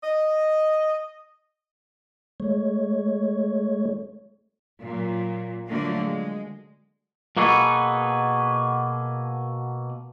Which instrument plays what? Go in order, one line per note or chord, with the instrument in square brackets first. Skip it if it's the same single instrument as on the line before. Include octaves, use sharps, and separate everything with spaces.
[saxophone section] D#5
[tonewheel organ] G#3 A3 C#5
[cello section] A#2 F#3
D3 F3 F#3 A3 A#3 F#4
G#3
[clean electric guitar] B2 A#3 F#4 G#4 A4 B4